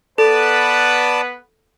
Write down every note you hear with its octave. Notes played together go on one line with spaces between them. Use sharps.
B3 A4 B4 D5 A5